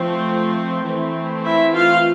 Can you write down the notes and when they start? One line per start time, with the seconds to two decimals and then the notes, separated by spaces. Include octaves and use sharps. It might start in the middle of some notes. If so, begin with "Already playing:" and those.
Already playing: F3 A3 C4
0.86 E3 A3 C4
1.45 E4 E5
1.74 F4 F5